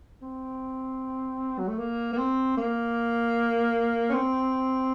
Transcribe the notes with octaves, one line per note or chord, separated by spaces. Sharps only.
C4
F#3
A3
A#3
A#3
C4
A#3
C#4
C4